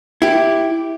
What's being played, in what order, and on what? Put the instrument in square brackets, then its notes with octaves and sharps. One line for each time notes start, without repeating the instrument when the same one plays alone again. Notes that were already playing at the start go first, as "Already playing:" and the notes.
[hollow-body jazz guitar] E4 G4